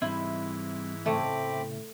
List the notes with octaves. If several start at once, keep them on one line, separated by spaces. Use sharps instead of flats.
G#2 E3 G3 C4 E4
A2 C#3 A3 C4 B5 D6